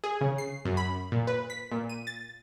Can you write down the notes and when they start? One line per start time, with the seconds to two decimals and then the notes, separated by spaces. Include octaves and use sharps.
0.04 G#4
0.21 C#3
0.38 C7
0.65 F#2
0.77 B5
1.12 A#2
1.27 B4
1.50 B6
1.72 A#2
1.90 D#7
2.07 A6